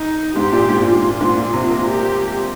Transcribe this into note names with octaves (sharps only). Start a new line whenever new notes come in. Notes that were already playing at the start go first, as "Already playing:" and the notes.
Already playing: D#4
G#2 G4
A#2
G#2
A#2 F4
G#2
A#2
G#2
A#2 F4
C3
A#3
G4